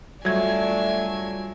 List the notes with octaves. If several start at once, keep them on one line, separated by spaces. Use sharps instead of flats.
F#3 G3 A3 D4 F4 E5 G#5 G#6